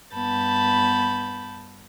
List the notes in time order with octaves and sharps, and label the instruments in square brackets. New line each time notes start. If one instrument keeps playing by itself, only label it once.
[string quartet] G2 B3 A5 B5 G6